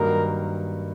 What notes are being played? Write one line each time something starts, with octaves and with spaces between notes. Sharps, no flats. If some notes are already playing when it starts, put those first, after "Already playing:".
Already playing: G2 D#3 F#3 A#3 D#4 A#4